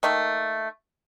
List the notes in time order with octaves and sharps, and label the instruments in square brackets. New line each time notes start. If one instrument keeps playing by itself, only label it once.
[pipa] D#3 A3 A#3